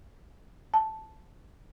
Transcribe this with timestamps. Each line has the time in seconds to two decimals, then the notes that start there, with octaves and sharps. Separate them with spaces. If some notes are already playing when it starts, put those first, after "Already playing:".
0.74 A5